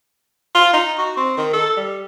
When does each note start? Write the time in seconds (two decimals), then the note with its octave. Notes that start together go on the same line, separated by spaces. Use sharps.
0.55 F4
0.73 D#4
0.98 F#4
1.17 C4
1.37 D#3
1.53 A4
1.77 G3